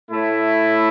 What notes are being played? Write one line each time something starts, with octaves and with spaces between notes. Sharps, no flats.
A2 A3 E4